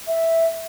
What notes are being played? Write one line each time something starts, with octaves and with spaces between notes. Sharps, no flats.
E5